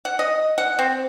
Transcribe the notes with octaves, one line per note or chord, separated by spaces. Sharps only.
F#5
D#5
F#5
C4